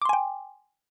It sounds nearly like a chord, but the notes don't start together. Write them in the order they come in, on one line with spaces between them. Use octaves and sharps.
D6 C6 G#5 G5